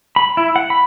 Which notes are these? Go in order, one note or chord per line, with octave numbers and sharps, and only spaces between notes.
B5
E4
F#5
B5